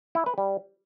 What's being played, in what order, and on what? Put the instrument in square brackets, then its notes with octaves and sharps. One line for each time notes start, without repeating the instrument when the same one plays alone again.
[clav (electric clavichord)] E4
B4
G3